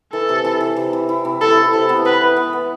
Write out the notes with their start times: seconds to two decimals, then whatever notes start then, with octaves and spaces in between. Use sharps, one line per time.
0.12 E3 A4
0.29 C3
0.45 E3
0.61 E3
0.76 C3
0.93 E4
1.09 E4
1.25 C3
1.41 E4 A4
1.57 E4
1.73 C3 A4
1.89 B3
2.05 B3 B4
2.21 E3
2.37 B3
2.53 B3